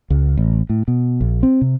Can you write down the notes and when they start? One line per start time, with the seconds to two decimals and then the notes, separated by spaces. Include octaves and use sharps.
0.10 C#2
0.37 A1
0.70 A2
0.88 B2
1.21 A#1
1.43 C4
1.62 C3